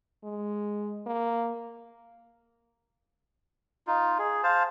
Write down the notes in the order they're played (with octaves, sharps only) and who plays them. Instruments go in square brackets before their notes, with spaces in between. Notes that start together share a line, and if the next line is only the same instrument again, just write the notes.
[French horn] G#3
A#3
[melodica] D#4 F4
G#4
C5 F5 A5